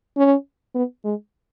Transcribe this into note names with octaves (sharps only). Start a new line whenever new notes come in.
C#4
B3
G#3